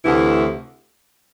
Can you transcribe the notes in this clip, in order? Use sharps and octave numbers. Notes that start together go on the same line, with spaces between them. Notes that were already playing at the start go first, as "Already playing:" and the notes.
D2 C3 E3 A3 E4